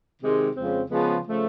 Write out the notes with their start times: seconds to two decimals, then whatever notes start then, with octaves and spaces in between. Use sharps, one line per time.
0.21 C3 D#3 G#3
0.55 F2 C#3 F3 G#3 C4
0.90 C#3 F3 G#3 B3
1.25 C#3 F3 A3